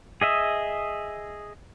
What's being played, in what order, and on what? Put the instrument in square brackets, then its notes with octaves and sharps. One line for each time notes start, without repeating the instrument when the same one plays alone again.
[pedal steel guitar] G#4 D#5 E5